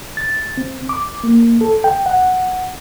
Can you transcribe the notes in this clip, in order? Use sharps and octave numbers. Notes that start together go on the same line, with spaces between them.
A6
C4
D6
A#3
A4
G5
F#5